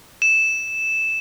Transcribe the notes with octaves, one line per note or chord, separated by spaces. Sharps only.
E7